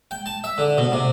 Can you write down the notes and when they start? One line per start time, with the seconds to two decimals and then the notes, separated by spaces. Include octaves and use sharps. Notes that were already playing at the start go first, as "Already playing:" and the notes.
0.11 G5
0.26 A5
0.44 E5
0.58 D3
0.78 B2
0.92 C3